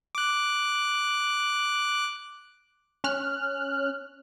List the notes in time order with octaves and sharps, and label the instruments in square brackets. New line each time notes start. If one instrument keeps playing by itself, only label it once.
[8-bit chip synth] D6 F#6
[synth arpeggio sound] C#4 F6 F#6